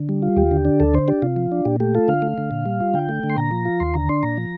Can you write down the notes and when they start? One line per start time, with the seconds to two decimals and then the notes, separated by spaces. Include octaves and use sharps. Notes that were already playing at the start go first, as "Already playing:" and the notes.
Already playing: D3
0.09 G3
0.22 F4
0.37 D#2 G4
0.51 D3
0.65 D4
0.80 D2 A4
0.94 D3 C5
1.08 D4 G4
1.22 C3 F4
1.36 F3
1.52 D4
1.65 A#2 G4
1.80 A3 G4
1.95 F4 A4
2.08 D3 F5
2.22 A3
2.38 D3
2.51 A#2
2.66 G3
2.80 F4
2.94 D3 G5
3.09 A3
3.23 D3
3.30 C6
3.37 A#2 A#5
3.51 F3
3.65 F4
3.80 D#2 C6
3.94 D3 A#5
4.09 D4 C6
4.23 A#2 A#5
4.37 F3